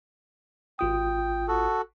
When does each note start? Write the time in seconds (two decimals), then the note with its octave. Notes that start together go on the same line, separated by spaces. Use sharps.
0.79 G#1 F4 G5 D#6
1.48 F#4 A4